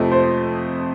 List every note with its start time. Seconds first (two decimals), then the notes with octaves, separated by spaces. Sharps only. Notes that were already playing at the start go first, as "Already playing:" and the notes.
Already playing: F2 C3 F3 A3 D#5
0.12 C5